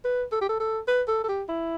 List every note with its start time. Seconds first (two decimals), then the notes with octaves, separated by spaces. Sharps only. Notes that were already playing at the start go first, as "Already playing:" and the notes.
0.04 B4
0.32 A4
0.41 G4
0.49 A4
0.60 A4
0.88 B4
1.08 A4
1.24 A4
1.28 G4
1.49 E4